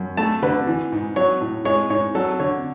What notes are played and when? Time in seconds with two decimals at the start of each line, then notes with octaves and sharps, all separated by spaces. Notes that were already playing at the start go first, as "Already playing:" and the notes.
Already playing: F#2
0.17 A3 A5
0.42 D3 B4
0.67 E3
0.92 G#2
1.16 F#3 C#5
1.41 A2
1.65 G#3 C#5
1.90 G#2 C#5
2.15 F#3 A4
2.39 D3 C#5